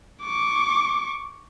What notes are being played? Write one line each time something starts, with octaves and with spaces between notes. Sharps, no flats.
C#6 D6